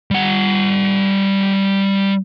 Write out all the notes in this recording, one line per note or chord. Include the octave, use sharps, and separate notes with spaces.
G3 F#5